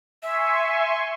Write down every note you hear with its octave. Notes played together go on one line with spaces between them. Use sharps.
E5 G#5 C6 C#6